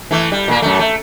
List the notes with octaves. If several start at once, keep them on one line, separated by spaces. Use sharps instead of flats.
E3 A3
G3
A#2 A#3
F#2 A3
A3